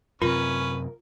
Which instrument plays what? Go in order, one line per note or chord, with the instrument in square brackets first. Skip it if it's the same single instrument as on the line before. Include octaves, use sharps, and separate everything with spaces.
[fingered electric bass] F#2 C3 C4 [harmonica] C#4 B4 [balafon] F4 [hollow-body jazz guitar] A#4